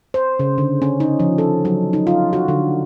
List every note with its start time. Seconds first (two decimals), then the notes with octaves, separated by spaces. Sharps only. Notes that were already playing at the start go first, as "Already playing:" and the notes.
0.14 C5
0.39 C#3
0.58 D3
0.82 C#4
1.00 D#4
1.20 F3
1.38 A4
1.65 F#3
1.93 D#4
2.07 F4
2.33 F#4
2.48 D3